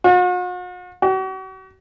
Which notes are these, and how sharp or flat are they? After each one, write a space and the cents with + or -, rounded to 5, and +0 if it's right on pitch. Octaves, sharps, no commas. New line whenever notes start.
F#4 -45
F#4 +40